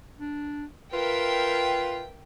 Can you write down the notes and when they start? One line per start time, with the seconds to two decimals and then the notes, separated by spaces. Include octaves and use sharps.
0.19 D4
0.93 F4 A#4 B4 E5 G5